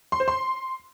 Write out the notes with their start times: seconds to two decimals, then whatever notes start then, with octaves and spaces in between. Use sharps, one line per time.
0.12 C6
0.20 C5
0.28 C6